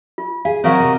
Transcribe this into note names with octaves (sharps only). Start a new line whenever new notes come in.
F4
G#4 F5
F#3 C4 F#4 A#4 C#5 D#5 F5 C#6
C3